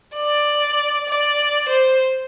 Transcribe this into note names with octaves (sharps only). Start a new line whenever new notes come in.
D5
D5
C5